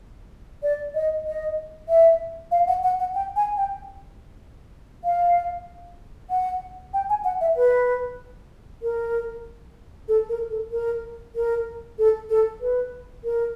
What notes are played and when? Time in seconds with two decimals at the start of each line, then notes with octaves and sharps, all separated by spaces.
0.63 D5
0.94 D#5
1.26 D#5
1.88 E5
2.51 F5
2.67 F#5
2.83 F#5
3.00 F#5
3.15 G5
3.36 G#5
3.57 G5
5.04 F5
6.30 F#5
6.93 G5
7.09 G#5
7.24 F#5
7.41 E5
7.56 B4
8.82 A#4
10.08 A4
10.29 A#4
10.50 A4
10.71 A#4
11.35 A#4
11.98 A4
12.30 A4
12.61 B4
13.24 A#4